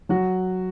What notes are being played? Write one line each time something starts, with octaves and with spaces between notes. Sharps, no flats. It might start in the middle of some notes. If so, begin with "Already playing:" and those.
F#3 F#4